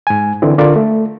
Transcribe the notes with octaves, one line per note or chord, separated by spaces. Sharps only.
G#2 G#5
D3 E3 C4
C#2 D3 F4 A#4 D5
A3